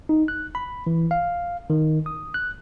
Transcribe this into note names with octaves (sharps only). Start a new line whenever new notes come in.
D#4
F#6
B5
E3
F5
D#3
D#6
F#6